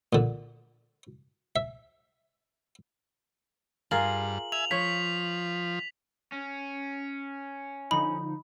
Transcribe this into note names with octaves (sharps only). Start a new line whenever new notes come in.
A#2 D3
E5
G2 F4 G#4 A#4 F#7
E5 G#5 F7
F3 C#5 B6
C#4
D3 F3 D#4 B5